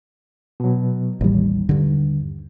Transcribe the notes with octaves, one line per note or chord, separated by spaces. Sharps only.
B2 F#3
A1 D#2 G3
G2 D3